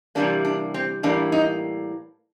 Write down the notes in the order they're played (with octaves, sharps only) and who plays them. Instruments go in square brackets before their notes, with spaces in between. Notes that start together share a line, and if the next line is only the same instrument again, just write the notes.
[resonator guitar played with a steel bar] C3 E3 G3 A#3 D4
D4
C4
A2 E3 G3 A#3 D4
D#4